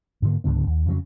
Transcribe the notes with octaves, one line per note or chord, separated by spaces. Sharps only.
G#2 D3 A#3
C#2 G#2 D3 B3
D#2
F2 C#3 E3 F#3